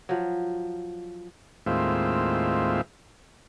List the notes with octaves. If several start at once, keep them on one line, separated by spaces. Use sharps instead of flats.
F3 F#3
D#2 A2 G#3 C4 F4 E5